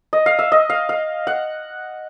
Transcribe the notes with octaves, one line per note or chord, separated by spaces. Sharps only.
D#5
F5
E5
D#5
F5
F5
F#5